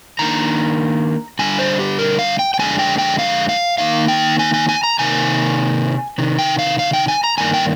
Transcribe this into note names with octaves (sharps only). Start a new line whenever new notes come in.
D#3 A#3 D4 A#5
D3 G3 D4 G#5
C5
G4
A#4
F5
G5
G5
F2 D3 G#3 D4 G#5
G5
G5
F5
F5
D#3 A#3 D#4 F5
G5
G#5
G#5
G#5
A#5
C3 D#3 A#3 G#5
C3 D#3
G5
F5
F5
G5
G#5
A#5
G2 D#3 A#3 D4 G#5
G5